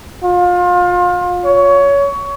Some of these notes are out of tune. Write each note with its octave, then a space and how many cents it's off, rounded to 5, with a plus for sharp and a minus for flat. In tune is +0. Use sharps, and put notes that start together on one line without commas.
F4 +30
C#5 +20